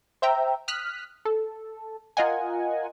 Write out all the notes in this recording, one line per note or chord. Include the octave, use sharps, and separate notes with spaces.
C5 E5 G5 A#5
D#6 F6 F#6 B6
A4
F4 A#4 D#5 F#5 G#5